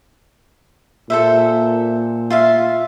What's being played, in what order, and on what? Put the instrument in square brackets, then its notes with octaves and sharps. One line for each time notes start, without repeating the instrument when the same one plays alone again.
[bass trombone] A#2 [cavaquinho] A4 C5 E5
[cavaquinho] F4 E5 F5